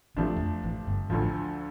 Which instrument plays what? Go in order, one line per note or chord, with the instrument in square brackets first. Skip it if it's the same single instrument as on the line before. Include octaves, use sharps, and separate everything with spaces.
[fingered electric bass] A1 A2 [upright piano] C3 F3 A3 D4
[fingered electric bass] E2
F2
A1 A2
G1 G2
[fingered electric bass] A1 A2 [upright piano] D2 D3 F3